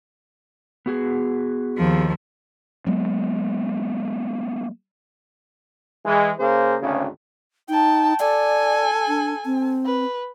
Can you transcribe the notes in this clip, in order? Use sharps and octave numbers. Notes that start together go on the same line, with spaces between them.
B3 F#4 G#4
D#2 F3
F#3 G#3 A#3 B3
E3 G#3
C#3 A#3 G#4 C5
G#1 D2 C#3
D#4 G5 A5
A4 D5 G#5
D4
C4
B4